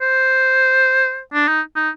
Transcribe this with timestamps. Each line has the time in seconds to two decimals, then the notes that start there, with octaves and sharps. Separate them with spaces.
0.01 C5
1.33 D4
1.48 D#4
1.76 D#4